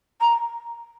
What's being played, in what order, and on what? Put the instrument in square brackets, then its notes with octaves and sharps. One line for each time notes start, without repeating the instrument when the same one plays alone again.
[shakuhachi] A#5